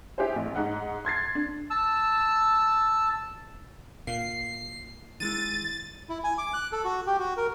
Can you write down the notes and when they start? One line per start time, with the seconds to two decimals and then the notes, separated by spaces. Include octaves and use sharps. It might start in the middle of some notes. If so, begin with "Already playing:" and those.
0.18 E4 G4 G#4 C5
0.36 A1
0.55 G#2 D#4 F#5 F#6
1.05 C6 G#6 A6 C7
1.35 D4
1.70 A5 E6
4.07 A#2 F5 C7
5.20 D#3 G#3 E4 A6 D#7
6.09 E4
6.24 G#5
6.38 D6
6.54 F#6
6.72 A4
6.84 F#4
7.07 G4
7.19 F#4
7.37 A#4